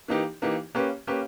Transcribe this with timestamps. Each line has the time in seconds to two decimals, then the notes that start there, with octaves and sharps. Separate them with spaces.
0.08 E3 A#3 D#4 G4
0.42 E3 A#3 D#4 G4
0.75 A#3 C#4 G4 B4
1.07 A#3 C#4 G4 B4